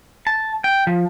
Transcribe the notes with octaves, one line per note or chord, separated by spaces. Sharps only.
A5
G5
F3